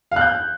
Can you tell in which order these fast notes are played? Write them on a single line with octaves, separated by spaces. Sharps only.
F5 F#6 G6